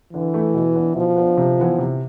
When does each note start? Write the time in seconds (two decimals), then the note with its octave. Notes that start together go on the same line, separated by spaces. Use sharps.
0.13 D3 E3
0.34 A3 E4
0.54 B2
0.75 B3 D4
0.96 B2 F3
1.16 B3
1.22 D4
1.37 C3
1.59 E3 B3 E4
1.79 C3